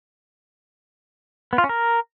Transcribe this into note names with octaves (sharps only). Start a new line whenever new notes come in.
B3
F4
C#4
A#4